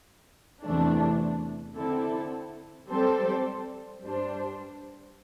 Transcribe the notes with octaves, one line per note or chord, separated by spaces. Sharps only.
E2 C3 E3 A3 D4
D3 C4 E4 A4
G3 C4 A4 C5
G2 G3 D4 C5